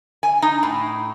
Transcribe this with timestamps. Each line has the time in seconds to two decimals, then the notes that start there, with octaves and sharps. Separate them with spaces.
0.23 G#5
0.42 D#4
0.63 A2